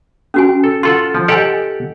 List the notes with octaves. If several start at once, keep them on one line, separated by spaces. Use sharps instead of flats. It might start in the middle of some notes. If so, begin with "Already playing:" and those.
C#4 F#4 G#5
A4
F4 A4 F#5 C6
F3
G4 A4 D#5 F#5 G#5